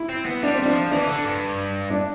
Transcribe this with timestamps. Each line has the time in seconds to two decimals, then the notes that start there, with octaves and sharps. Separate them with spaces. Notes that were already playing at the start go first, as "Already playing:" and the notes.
Already playing: E4
0.09 C4
0.25 B3
0.42 G3 D4
0.54 C4
0.62 G3
0.65 F3 D4
0.91 E3 D4
1.08 D3
1.24 G2
1.90 D4